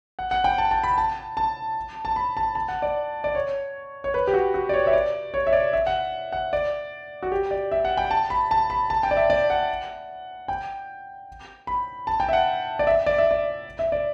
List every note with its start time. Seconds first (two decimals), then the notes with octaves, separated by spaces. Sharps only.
0.19 F#5
0.31 F#5
0.44 G5
0.58 A5
0.71 A5
0.83 B5
0.98 A5
1.37 A5
2.05 A5
2.16 B5
2.37 A5
2.55 A5
2.68 F#5
2.82 D5
3.24 D5
3.35 C#5
4.04 C#5
4.14 B4
4.27 G4
4.34 F#4
4.54 F#4
4.69 D5
4.73 C#5
4.87 E5
4.93 D5
5.34 C#5
5.47 E5
5.53 D5
5.73 E5
5.87 F#5
6.32 F#5
6.53 D5
7.23 F#4
7.32 G4
7.51 D5
7.72 E5
7.85 F#5
7.97 G5
8.11 A5
8.30 B5
8.51 A5
8.70 B5
8.90 A5
9.03 G5
9.11 D5
9.17 E5
9.30 D5
9.50 F#5
10.48 G5
11.67 B5
12.07 A5
12.20 G5
12.29 E5
12.33 F#5
12.79 D5
12.87 E5
13.06 D5
13.18 E5
13.31 D5
13.79 E5
13.92 D5